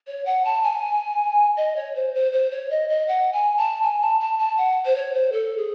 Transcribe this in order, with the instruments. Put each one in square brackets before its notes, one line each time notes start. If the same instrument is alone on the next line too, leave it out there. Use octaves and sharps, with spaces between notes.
[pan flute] C#5
F#5
A5
G#5
D#5
C#5
C5
C5
C5
C#5
D#5
D#5
F#5
G#5
A5
G#5
A5
A5
A5
F#5
C5
C#5
C5
A4
G#4